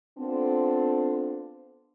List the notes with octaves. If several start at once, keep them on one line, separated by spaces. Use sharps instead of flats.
B3 C4 D4 F4 A4 C5